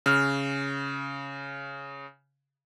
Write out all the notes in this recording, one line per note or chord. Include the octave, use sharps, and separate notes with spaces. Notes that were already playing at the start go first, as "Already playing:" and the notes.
C#3 F6